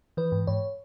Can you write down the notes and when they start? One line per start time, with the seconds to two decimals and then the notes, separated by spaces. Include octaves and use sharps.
0.17 E3 B4
0.32 G#2
0.47 G#2 C#5